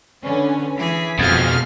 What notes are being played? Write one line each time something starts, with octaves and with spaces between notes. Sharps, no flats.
D3 C#4 B4
E3 G#4 B6
F2 B2 G#3 F5 F6